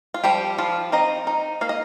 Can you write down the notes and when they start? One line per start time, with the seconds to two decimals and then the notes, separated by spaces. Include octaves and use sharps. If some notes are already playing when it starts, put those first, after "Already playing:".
0.14 F4
0.24 F3 G3 G4
0.58 F3 F4
0.92 C4 D#4 D#5
1.27 D#4
1.61 A#3 F5
1.69 D#5